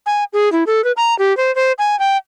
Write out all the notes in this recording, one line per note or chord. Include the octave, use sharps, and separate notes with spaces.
G#5
G#4
E4
A4
B4
A#5
G4
C5
C5
G#5
G5